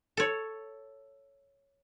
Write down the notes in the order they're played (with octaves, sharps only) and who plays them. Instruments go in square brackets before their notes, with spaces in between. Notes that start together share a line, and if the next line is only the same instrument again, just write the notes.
[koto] A4 C#5